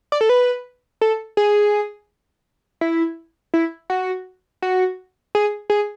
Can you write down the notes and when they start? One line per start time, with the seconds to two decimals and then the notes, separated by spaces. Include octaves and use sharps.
0.12 D5
0.21 A4
0.29 B4
1.01 A4
1.37 G#4
2.81 E4
3.54 E4
3.90 F#4
4.62 F#4
5.35 G#4
5.70 G#4